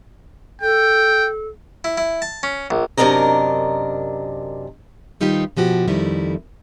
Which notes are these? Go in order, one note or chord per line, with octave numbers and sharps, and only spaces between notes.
A4 G5
E4
E4
A5
C#4
A#1
F#2 C3 D4 A#4 D#5 A#5
D#3 G3 D#4 F4 G4 B4
B2 F3 F#4 G4
F2 D#3 G3 A3 E4